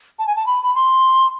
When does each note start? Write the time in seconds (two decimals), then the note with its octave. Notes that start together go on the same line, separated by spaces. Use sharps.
0.19 A5
0.26 G#5
0.36 A5
0.46 B5
0.63 B5
0.75 C6